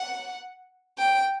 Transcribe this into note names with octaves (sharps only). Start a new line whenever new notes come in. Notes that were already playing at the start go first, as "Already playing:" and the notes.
Already playing: F#5
G5